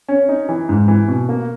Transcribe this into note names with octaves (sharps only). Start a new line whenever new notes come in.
C#4
D#4
E3
G#2
E3
B2
A#3